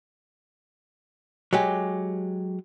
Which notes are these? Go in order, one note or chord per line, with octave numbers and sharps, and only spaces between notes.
F#3 G#3 G4